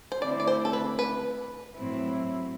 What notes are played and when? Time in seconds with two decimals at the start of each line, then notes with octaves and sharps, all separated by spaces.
0.12 C5
0.22 D3 A3 C4 E4 D5
0.40 D5
0.48 C5
0.65 A4
0.73 B4
0.99 B4
1.76 A2 F#3 C4 E4